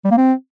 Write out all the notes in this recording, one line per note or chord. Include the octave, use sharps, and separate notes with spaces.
G3
A#3
C4